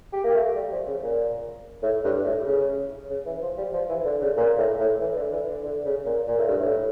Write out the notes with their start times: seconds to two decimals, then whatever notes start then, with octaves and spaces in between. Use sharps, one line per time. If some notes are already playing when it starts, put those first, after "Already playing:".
0.13 G4
0.24 A#3
0.34 A3
0.56 G3
0.72 F3
0.87 C#3
1.03 A#2
1.83 A2
2.04 G2
2.25 A2
2.46 C#3
3.10 C#3
3.25 E3
3.42 F3
3.57 G3
3.73 F3
3.89 E3
4.05 D3
4.21 C#3
4.37 A#2
4.58 A2
4.79 A2
5.00 E3
5.16 D3
5.32 E3
5.48 D3
5.64 D3
5.85 C#3
6.06 A#2
6.27 A#2
6.38 A2
6.48 G2
6.58 A2